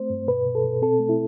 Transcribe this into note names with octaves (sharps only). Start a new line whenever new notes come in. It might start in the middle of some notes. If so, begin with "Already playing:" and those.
Already playing: A3 C4 C5
G2
B2 B4
B2
A4
B2
C4 A4
A3
E4